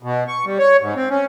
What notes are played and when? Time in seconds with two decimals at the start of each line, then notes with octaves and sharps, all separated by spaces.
0.03 B2
0.28 C#6
0.46 G3
0.59 C#5
0.81 G#2
0.96 C4
1.10 C#4